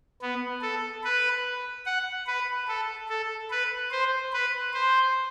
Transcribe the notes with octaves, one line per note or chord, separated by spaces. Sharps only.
B3
A4
B4
F#5
B4
A4
A4
B4
C5
B4
C5